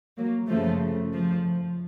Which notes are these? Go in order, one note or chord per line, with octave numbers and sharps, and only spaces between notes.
F#3 A#3
F#2 C#3 F3 A3
F3